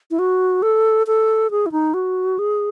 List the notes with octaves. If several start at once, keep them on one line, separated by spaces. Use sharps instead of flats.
E4
F#4
A4
A4
G#4
E4
D#4
F#4
G#4